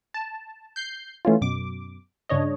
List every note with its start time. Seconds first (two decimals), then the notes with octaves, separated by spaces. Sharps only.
0.14 A5
0.76 G6 C7
1.25 E3 A3 C#4 F4
1.41 F#2 B2 D6
2.29 G2 C#3 D4 C#5 D#5